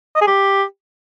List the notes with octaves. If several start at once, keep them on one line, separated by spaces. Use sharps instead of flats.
D#5
G#4
G4